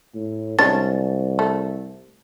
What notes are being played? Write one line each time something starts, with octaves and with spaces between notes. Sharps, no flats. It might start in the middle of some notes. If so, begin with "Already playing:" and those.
A2
C2 G#3 C#4 D4 A6
A3